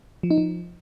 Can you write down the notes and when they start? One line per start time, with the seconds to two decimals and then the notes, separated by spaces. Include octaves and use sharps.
0.23 F3
0.31 D#4
0.38 F3